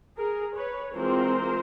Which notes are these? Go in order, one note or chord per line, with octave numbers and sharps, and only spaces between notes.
G#4 A#4
B4 C#5
E3 G#3 C4 F4 A#4 C5